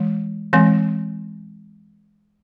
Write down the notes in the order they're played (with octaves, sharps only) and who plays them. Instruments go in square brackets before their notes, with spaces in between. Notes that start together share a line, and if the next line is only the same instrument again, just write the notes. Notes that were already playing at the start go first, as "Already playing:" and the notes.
Already playing: [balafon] E3 G#3
E3 G#3 C4